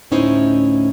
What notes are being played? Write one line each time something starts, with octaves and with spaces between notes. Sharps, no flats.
D2 A2 C#4 D#4 E4 C5